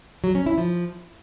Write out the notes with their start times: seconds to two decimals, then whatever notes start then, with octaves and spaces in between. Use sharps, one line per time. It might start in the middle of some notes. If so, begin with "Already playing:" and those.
0.24 F#3
0.35 C#4
0.46 E4
0.58 F3